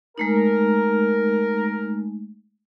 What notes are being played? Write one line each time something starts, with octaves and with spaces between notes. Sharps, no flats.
G#3 A3 D#4 A#4